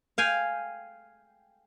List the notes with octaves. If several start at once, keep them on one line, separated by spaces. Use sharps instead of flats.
F5 G5 G#5